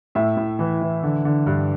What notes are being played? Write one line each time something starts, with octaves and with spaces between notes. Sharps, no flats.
A2 E5
A2
E3
E3
D3
D3
G2